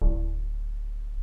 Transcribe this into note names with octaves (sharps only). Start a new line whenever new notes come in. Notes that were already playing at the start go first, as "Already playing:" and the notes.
D1